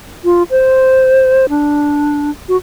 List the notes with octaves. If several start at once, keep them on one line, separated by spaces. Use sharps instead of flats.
F4
C5
D4
F#4